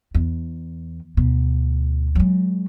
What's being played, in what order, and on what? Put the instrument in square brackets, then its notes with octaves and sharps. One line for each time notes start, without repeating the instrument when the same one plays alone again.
[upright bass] E2
[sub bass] D2 [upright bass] B2
[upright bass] F#3 G#3